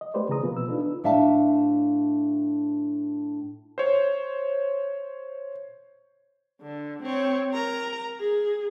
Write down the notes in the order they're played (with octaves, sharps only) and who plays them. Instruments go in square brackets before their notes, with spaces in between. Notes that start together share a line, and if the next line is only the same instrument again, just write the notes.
[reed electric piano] D#5
A3 G4 B4 C5 D5
C#3 E3 G#4 A#5 D#6
B2 F3 A#3 B3 F4 B4
E6
D4 D#4 F4 A4 B4
[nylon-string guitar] A2 D4 E5 F5 A5
[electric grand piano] C5 C#5
[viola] D3
C4 C#5
A#4 A#5
G#4